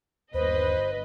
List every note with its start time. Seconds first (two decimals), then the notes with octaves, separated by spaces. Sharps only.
0.34 G1 D#2 B4 C5 D#5